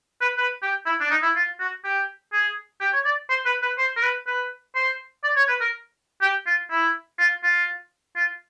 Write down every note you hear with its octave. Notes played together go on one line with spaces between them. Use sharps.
B4
B4
G4
E4
D4
D#4
E4
F4
F#4
G4
G#4
G4
C#5
D5
C5
B4
B4
C5
A#4
B4
B4
C5
D5
C#5
B4
A#4
G4
F4
E4
F4
F4
F4